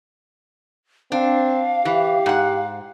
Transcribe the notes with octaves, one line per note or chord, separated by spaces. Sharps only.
C4 D4 F5
E3 G4
G#2 F#5